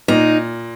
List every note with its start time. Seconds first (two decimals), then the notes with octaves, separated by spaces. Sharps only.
0.08 A#2 D#4